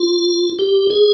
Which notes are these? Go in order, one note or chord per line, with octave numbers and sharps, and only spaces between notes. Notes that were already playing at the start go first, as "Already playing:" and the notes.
Already playing: F4
G4
G#4